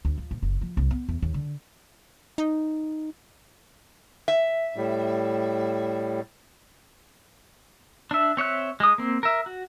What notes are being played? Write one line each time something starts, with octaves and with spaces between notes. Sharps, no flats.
D2
F3
A#1
F#1
F3
C2
B3
E2
D#2
D3
D#4
E5
A2 G3
D4 E5
C4 C#5 E5 F#6
G#3 D#6
A#3 C4
A#4 E5
F#4